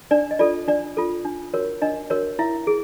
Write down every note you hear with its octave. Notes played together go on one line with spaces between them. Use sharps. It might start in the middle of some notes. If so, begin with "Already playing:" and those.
D4 D5
D#5
F4 A4 D5
D4 D5
F4 A4
D4
F#4 A#4 C#5
D4 D#5
F#4 A#4 C#5
E4 E5
G#4